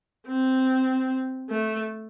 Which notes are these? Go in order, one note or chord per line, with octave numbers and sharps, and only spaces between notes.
C4
A3